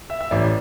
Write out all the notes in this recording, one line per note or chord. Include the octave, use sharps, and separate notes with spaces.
E5
E5
A1 A2 E3 D5